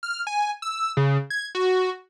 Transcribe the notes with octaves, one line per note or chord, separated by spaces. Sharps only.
F6
G#5
E6
C#3
G#6
F#4